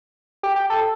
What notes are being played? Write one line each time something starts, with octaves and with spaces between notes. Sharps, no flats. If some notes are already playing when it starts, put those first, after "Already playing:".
G4
G4
A4